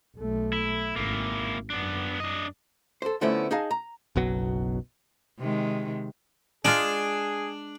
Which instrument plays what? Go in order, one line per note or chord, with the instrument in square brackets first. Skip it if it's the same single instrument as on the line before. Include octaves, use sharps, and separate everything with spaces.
[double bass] B1 A3
[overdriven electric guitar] E4
[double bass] G#1 [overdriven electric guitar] A#3 E4
[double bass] F#2 [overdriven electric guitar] B3 D4
[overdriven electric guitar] D4 D#5
[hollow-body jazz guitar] A4 C5
D3 F3 A3 B3 C#4 E4
D#4 G#4 D#5 F5 A5
A#5
[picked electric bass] F#1 B1 B2 F#3
[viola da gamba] C3 D#3 G#3
[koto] G#3 F4 [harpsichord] D4 [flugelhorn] G#4